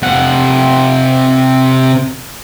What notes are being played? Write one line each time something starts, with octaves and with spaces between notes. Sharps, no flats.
C3 F#5